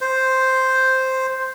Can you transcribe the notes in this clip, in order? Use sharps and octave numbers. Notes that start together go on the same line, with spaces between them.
C5